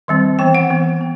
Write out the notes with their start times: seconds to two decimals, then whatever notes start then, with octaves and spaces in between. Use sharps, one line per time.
0.08 D#3 G3 C4
0.39 E3 B3 G5
0.55 F#5
0.70 E3 B3
1.01 B3